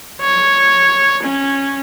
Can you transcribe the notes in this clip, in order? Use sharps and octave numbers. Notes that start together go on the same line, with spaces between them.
C#5
C#4